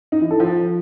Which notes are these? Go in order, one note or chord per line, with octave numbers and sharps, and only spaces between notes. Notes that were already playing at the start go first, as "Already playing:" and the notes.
D#4
E3
A4
F3